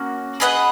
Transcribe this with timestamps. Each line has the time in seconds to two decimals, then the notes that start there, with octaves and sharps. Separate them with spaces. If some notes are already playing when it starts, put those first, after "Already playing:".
Already playing: A#3 C#4 F#4
0.40 G#4 B4 D#5 F#5